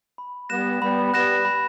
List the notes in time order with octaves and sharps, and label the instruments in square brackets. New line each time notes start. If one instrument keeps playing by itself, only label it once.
[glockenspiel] B5
[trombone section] G3 B3 [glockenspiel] F#6 A#6 E7
[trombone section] G3 B3 [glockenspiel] B5
[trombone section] G3 B3 [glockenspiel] F#6 A#6 E7
[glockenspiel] B5